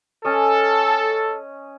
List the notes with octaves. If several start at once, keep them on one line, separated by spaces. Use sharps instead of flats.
C#4 A4 D#5